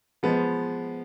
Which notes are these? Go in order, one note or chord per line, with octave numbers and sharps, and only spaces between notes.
F3 G#3 B3